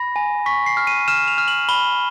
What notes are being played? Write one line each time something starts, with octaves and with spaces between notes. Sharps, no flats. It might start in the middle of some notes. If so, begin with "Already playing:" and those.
Already playing: B5 A#6
G#5
C#6 B6
C7
F6
D#7
F6 E7
F7
F6
F#7
B5 G7